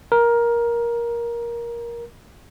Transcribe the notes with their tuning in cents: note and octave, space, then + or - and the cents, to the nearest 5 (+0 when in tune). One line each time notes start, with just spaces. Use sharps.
A#4 +15